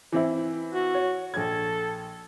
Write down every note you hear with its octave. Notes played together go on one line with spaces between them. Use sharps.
E3 C4 E4
F#4
C#5
A#1 A4 G#6